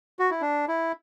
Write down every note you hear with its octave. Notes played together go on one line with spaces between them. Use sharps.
F#4
E4
D4
E4